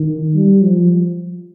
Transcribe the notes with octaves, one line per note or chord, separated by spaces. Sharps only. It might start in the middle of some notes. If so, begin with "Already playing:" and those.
Already playing: D#3
G3
F3